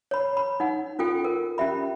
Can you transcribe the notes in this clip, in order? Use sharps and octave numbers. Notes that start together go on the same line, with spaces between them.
C#5 B5
B5
D#4 F#5
C#4 F4 A4 G5
A#4
C#4 G4 E5 B5